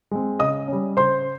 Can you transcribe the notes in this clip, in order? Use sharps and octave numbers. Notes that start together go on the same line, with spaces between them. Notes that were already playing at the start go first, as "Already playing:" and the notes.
G#3 C4
C#3 D#5 D#6
G3 C#4
C#3 C5 C6